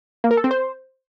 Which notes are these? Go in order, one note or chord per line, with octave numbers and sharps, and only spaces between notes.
A#3
A#4
A4
C4
C5